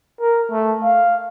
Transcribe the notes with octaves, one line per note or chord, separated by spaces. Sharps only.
A#4
A3
F5